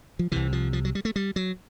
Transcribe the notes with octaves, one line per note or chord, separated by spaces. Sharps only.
F3
C2 C3 E3
F3
F3
F#3
G3
A3
G3
F#3